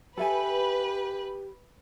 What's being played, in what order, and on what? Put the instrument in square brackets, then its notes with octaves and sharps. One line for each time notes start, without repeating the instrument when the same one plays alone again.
[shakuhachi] G4 [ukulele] A4 E5 G#5 [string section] B4